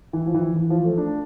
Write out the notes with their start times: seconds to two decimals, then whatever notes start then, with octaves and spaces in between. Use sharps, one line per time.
0.13 E3
0.27 F3
0.34 E3
0.56 E3
0.70 F3
0.84 A3
0.98 D4